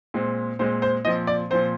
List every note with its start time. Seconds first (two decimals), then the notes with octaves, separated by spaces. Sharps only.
0.14 A#2 G#3 C4
0.59 A#2 G#3 C4 C5
0.82 C5
1.05 A#2 F3 C4 D#5
1.27 D5
1.50 A#2 F3 C4 C5